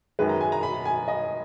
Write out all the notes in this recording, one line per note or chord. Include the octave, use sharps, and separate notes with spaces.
F#2 D#3 G#3 B4
A#5
G#5
A#5
B5
A#5
G#5
D#5